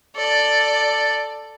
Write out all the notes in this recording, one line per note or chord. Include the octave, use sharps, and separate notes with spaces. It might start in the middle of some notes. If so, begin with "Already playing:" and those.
A4 D5